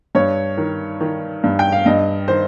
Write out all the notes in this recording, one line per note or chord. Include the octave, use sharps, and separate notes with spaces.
G2 C#5
D#3
D#3
G2
G5
F5
G2 D#5
D#3 C5